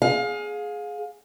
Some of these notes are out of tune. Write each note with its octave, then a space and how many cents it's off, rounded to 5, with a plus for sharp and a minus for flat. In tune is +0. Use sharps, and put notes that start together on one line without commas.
G#4 +10 F5 +30